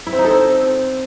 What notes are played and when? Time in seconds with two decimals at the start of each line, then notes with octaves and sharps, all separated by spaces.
0.07 E4
0.13 C4
0.19 D#4
0.25 A4
0.31 C4